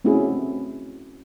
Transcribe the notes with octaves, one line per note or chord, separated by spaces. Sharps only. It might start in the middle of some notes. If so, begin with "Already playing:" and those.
A3 C4 C#4 E4 F#4 G#4